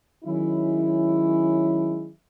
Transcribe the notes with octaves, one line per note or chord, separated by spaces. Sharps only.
D#3 F#3 G#3 C#4 E4